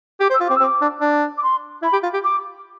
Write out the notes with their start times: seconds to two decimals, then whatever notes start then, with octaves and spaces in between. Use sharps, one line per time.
0.20 G4 D6
0.30 C5
0.33 E6
0.41 F4
0.47 C4 D6
0.55 E6
0.60 C4
0.63 D6
0.81 D4
1.01 D4
1.37 D6
1.43 C6
1.82 E4 B5
1.93 G4
2.03 F4
2.14 G4
2.24 D6